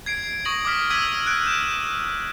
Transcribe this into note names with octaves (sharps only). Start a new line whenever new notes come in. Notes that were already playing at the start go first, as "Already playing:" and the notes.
G#6 C7 D7
C#6 D#6 A#6 D7 F#7
D6 D#6 F6 B6 F#7
D6 E6 G#6 B6 D#7
F#6 G#6 D7
G6 E7